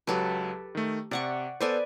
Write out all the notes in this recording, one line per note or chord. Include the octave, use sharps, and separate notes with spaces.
C#2 F#3 G4 A4 B4
D#3 A3
C3 D5 F#5 C#6
B3 A4 B4 C5 D5 G#5